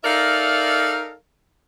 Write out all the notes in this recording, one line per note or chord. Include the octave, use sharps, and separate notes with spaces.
D#4 A4 A#4 D5 E5 F5